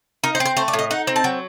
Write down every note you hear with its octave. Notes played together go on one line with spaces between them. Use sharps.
D#4 A#4
C5
C4
C5
A3 C5
D5
A2
D#5
D#4 F#5
C4
A5
F#3 G5